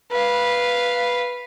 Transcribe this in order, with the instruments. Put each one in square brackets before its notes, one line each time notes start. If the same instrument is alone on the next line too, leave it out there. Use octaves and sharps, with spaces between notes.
[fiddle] B4 F5